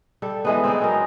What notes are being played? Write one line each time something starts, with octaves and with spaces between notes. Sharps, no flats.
G3 A4
E3 G#3 B3
C4 D#4 G#4 D5
F#3 A#4